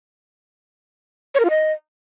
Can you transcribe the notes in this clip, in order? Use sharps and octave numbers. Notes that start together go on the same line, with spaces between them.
C#5
A#4
F4
D#5